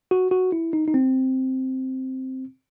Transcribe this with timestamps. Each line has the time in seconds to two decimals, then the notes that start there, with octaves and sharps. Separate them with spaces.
0.11 F#4
0.31 F#4
0.52 E4
0.73 D#4
0.88 D#4
0.94 C4